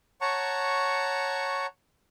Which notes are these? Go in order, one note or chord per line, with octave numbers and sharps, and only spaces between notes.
C#5 F#5 A5 A#5 C#6